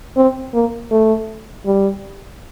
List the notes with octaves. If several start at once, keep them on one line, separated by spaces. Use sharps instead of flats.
C4
A#3
A3
G3